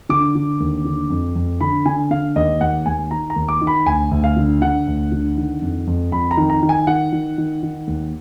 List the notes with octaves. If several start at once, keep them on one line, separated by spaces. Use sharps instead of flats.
D3 D6
D3
D#2
D3
F2
F2
D3 B5
D3 G#5
D3 F5
D#2 D#5
D#2 F#5
D#2 G#5
D#3 A#5
A#5
D#2
D6
D#3
B5
D2 G#5
D2
F5
D3
D3 F#5
D2
D3
D#3
F2
F2
F2 B5
A#5
D#3
A#5
D#3
G#5
D#3 F#5
D#3
D#3
D#3
D#2